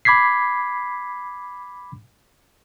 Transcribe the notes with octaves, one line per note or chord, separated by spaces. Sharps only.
B5 D6 G#6 B6 C7